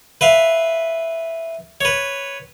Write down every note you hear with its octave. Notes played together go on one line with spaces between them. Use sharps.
B4 E5 F5
B4 C#5